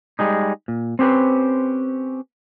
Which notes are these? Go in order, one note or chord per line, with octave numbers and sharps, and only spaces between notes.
G3 G#3 D#4
A#2
C4 C#4 G4 G#4 B4 C5